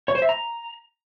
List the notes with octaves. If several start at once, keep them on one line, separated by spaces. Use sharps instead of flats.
C#5
C5
E5
A#5